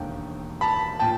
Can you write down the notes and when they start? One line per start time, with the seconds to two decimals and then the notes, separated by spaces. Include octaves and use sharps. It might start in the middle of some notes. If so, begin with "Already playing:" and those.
Already playing: E1 D#2 D3 G5
0.61 A5 B5
0.99 A#2 G5 A5